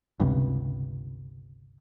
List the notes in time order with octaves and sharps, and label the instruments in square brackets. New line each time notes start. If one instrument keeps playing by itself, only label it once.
[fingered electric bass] G1 C#2 C3